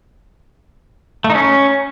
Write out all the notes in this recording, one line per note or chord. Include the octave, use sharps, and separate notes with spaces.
A3
D#4
C#4